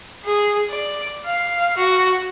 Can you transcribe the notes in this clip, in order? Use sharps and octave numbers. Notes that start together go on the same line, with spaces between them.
G#4
D5
F5
F#4